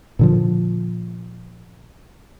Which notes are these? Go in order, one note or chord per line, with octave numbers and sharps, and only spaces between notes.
A#2 D3 F3